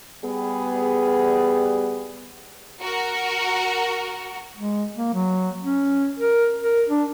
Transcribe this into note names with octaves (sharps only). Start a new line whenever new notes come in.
G3 B3 G#4
F#4 A#4
G#3
A#3
F#3
C#4
A#4
A#4
D4